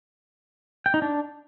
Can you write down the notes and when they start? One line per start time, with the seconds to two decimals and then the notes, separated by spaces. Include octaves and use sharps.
0.86 G5
0.94 D#4
1.02 D4